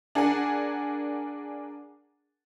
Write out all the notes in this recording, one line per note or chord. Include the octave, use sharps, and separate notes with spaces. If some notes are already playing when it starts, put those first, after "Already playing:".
D4 G#4 A#4 F#5 G#5